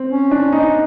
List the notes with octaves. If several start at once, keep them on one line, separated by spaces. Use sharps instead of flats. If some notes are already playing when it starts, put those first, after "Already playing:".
Already playing: C4
C#4
D4
D#4